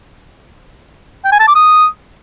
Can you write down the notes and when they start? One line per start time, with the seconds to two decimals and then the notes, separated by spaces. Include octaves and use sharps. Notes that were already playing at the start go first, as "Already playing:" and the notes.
1.24 G5
1.32 G#5
1.40 A5
1.47 D6
1.55 D#6